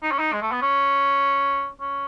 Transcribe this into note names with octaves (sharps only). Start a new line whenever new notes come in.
D#4
C#4
D#4
G#3
A3
B3
C#4
C#4